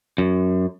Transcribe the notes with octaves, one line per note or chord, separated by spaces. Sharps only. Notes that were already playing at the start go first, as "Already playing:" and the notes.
F#2